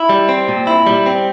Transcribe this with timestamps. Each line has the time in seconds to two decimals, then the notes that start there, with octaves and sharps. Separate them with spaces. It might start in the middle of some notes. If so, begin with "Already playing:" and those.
Already playing: E4
0.09 G3
0.29 C4
0.48 A#2
0.67 E4
0.86 G3
1.06 C4